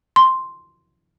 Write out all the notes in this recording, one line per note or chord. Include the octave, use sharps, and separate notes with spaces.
C6